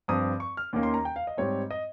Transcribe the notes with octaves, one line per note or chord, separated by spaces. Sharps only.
G2 F3 C4 D#6
C#6
F6
D#2 D#3 A#3 C#4
C6
A#5
G5
F5
D#5
G#2 G3 C4 C#5
D#5